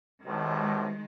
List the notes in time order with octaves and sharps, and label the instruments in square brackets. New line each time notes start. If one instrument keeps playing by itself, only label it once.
[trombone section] B1 A2 C3 [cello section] D#3 G#3